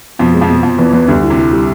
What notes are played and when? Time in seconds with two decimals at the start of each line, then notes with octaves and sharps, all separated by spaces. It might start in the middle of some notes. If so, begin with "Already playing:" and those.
0.19 F2 B2 F3
0.34 G#3
0.41 F2 F3
0.49 B2
0.63 F2 B2 F3
0.78 E2 E3 B3
0.92 E2 E3 B3
1.07 D2 D3 G3
1.23 E4
1.30 C3
1.37 E4
1.52 G3